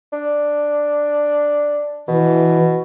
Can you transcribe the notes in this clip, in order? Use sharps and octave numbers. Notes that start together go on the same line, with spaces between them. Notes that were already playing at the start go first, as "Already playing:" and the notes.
D4
B2 E3